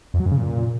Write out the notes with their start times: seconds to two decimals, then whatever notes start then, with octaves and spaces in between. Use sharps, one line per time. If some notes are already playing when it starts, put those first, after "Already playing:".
0.14 F2
0.20 F#3
0.26 F#2
0.32 C#3
0.38 A#2